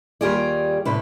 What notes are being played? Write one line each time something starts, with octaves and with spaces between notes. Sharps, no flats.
D#2 G3 F4 G4 G#4 D5
A2 C3 B4